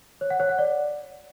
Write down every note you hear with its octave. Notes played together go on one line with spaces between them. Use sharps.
C#5
F#5
C#5
F#5
D5